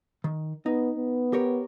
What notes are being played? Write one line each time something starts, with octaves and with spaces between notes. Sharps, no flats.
D#3
B3 D#4
B3
G4 A#4 C#5